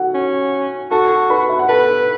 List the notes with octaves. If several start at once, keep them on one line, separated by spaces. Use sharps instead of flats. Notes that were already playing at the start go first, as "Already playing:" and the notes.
Already playing: F#4 A4 F#5
C#4
F#4 A4 A5
B4 B5
E5
F#5
A4 B4 A5